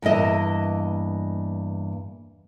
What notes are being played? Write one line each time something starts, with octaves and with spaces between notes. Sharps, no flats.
E2 G2 A#3 D#5 E5